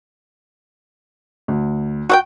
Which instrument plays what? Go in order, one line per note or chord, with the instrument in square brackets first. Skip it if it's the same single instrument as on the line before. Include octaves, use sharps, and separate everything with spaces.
[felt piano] D2
[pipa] F#4 F#5 G5